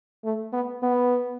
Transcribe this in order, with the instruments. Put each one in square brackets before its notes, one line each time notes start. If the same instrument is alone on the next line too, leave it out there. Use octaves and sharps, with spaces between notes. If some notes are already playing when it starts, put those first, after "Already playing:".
[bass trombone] A3
B3
B3